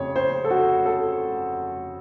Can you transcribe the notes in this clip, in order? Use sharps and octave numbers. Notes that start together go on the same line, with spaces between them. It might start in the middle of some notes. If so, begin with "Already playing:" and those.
Already playing: F1 F2 C#3 C#5
C5
A4
F#4
A4